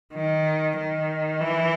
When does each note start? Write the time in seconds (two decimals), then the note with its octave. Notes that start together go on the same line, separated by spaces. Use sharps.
0.14 D#3
0.78 D#3
1.40 E3